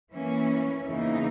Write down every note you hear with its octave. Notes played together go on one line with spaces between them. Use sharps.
E3 A#3 C#4
E2 C#3 E3 A#3 D#4